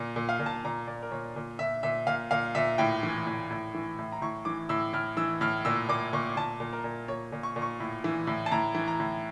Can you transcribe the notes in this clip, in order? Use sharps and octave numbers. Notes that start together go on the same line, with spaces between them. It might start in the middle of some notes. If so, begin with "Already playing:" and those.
Already playing: A#2
A#2
F5
A#2
A5
A#2 A#5
A#2 D5
A#4
A#2 C#5
A#2
A#2 E5
A#2 E5
A#2 F5
A#2 F5
A#2 E5
A2 G5
E3
A2
A2
E3
A2
A#5
A2 C#6
E3 D6
A2 E6
A2 F6
E3 E6
A2 F6
A#2 E6
A#2 D6
A#2 C#6
A#2 A5
A#2
A#4
A#2
A#2 C#5
A#2
C#6
A#2
C#6
A2
E3
A2
A5
A2 A#5
E3
A#5
A2